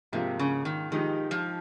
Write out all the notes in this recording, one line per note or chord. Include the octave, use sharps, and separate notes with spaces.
G#2 C3 F3 A#3
C#3
D#3
D#3 F3 G#3 D#4 G4
F3